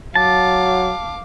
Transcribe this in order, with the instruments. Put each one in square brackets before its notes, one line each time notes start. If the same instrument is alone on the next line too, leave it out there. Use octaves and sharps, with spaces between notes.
[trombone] F#3 [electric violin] F5 D6 [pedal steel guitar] A5